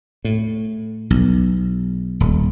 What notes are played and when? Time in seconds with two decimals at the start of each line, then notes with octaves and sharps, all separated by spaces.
0.25 A2
1.10 B1
2.20 D#1